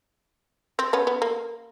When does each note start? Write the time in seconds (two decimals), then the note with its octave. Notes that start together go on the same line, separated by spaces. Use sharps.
0.79 C4
0.93 B3 C#4
1.07 B3
1.22 A#3